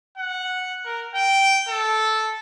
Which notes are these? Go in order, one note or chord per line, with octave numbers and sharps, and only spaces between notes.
F#5
A#4
G5
A4